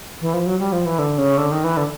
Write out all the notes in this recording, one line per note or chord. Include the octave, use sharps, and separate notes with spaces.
E3
F3
F#3
G3
F3
E3
D3
C#3
D3
D#3
E3
D3